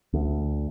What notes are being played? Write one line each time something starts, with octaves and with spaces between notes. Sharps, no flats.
D2